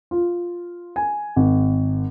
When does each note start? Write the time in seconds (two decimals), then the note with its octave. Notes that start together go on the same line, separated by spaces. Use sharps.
0.11 F4
0.96 G#5
1.36 G#1